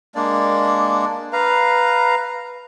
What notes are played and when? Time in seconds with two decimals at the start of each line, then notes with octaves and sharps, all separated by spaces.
0.15 G#3 A#3 D4 D5
1.33 B4 F5 A#5